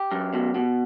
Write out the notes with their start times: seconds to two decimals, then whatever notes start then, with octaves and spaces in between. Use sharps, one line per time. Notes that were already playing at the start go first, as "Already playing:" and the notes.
Already playing: G4
0.12 F#2
0.34 B2
0.55 B2